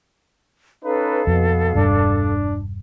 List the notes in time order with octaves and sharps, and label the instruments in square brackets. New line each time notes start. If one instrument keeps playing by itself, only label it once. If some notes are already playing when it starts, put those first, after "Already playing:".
[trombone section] C#4 D#4 B4 [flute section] A4 F5
[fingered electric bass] F2 [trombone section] B2
[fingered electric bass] E1 G2 [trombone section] D4